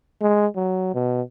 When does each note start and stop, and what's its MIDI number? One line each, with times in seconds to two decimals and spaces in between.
0.22 0.47 56
0.56 0.92 54
0.94 1.22 47